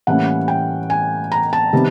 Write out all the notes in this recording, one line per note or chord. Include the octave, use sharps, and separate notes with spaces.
A2 E3 G3 A#3 C#4 F#5
G5
G#5
A#5
A5
C3 D#3 G3 B3